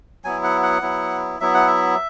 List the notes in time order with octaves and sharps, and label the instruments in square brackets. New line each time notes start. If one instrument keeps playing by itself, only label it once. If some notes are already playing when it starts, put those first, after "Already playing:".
[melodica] F#3 B3 E4 G#5
F#5
F#5
F#3 B3 E4
F#3 B3 E4 E5
F#5
E5